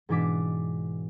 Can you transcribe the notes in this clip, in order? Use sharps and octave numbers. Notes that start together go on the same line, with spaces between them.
G#2 B2 E3 D4 D6 B6